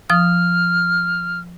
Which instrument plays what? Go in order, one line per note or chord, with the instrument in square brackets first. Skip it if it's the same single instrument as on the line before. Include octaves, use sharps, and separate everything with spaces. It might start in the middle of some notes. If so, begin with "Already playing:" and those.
[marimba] F3 D#6 [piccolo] F6